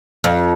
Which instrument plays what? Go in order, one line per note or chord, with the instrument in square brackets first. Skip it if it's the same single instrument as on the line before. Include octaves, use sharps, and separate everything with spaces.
[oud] F2